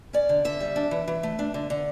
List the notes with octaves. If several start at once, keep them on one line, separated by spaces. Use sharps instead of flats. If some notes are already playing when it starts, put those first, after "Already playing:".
C#4 D5
D3
D3 E5
G3
D4
E3
E3
A3
D4
D3
D3